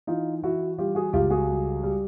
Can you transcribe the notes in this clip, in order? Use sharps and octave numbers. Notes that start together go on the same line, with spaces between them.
E3 D#4 F4
E3 E4 F#4
G3 F4 G4
F#4 G#4
C#2 F4 G4
F#4 G#4
G3
G3